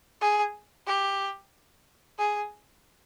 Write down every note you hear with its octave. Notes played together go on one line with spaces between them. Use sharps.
G#4
G4
G#4